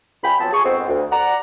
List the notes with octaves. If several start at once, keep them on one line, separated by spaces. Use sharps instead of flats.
C#2 F4 G5 G#5 B5
F3 F#3 B3 C4 A5
G#4 C#6
F2 G#2 B3 C4
D2
D5 F#5 A#5